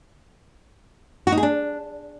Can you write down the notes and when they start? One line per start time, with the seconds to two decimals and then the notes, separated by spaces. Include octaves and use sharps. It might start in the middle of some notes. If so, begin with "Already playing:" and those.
1.27 F#4
1.32 D#4
1.38 G#4
1.43 D4